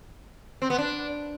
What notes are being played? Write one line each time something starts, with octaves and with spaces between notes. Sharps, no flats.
C4
B3
D4